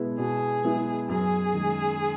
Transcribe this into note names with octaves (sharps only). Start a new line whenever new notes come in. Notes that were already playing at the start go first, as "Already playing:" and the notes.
Already playing: B2 G#3 B3 E4
B2 G#4
G#3 B3 E4
F#2 G#4
D#3 G#3